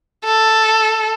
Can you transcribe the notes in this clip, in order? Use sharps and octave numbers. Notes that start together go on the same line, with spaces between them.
A4